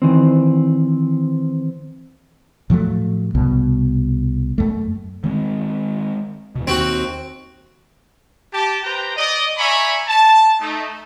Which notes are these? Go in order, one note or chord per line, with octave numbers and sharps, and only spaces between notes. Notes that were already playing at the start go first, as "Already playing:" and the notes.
D#3 E3 C4
A2 F3 F#3 A3
C2 B2
F#2 A3
D#3 G#3 C4
D#2 B2
D#2 C4 F#4
G4 A5
G4 B4 C5 G5 A#5
D5 D#5
D5 E5 G#5 A#5 B5 C#6
A5
A3 D#4